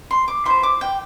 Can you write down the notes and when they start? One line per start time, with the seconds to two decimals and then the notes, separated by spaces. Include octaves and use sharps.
0.11 C6
0.28 D6
0.45 E4 C5 C6
0.63 D6
0.81 G5